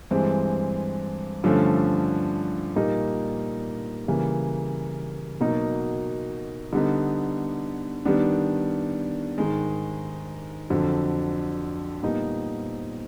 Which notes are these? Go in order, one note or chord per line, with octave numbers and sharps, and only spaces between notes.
G2 E3 G#3 C4
G2 D3 F3 A3 C#4
A#2 G3 A#3 D#4
C#3 E3 G3 A#3
B2 F#3 A#3 D#4
D3 G3 B3 D#4
D#3 G3 B3 D4
G#2 D#3 G#3
F2 D3 F#3
A#2 G3 B3 D#4